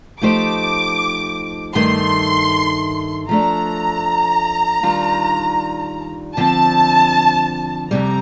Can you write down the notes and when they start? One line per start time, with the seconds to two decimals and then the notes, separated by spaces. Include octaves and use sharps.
0.21 F3 A3 D#4 G4 C5 D6
1.75 G2 D#3 A3 C6
3.29 F3 A3 D4 A#5
4.83 D#3 G3 D4 F4
6.37 D3 F3 C4 A5
7.91 F2 C3 G3 A#5